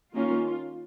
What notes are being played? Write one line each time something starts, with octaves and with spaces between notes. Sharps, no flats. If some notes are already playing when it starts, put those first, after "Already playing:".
D#3 A#3 C#4 F4